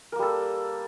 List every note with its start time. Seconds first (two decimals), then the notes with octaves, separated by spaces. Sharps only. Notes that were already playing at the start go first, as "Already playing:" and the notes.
0.12 A#4
0.16 A#3
0.19 G3
0.22 A4